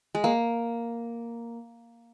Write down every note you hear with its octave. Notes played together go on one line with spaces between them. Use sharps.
G#3
A#3